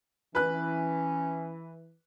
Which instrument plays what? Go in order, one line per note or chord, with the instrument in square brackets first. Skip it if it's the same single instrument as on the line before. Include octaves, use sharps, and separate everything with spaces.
[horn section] E3 [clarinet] C#4 [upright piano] B4 F#6